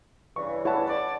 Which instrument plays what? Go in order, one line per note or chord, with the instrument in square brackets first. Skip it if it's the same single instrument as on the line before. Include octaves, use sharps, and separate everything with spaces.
[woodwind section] G2 C#3 E3 [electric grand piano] C#6
[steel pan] E4 B4 [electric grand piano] C#5 F#5 A5
[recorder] D5